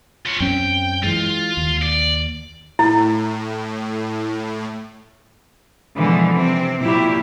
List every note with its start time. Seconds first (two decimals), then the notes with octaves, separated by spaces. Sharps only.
0.26 F4 C#5
0.40 F#2 C4 C#4 G5
1.03 E3 G#3 F4
1.57 D#2
1.82 D5
2.79 A2 E4
5.97 B2 D3 E3 F3 G#3
6.34 C3 C4
6.81 A#2 F#3 E4 G4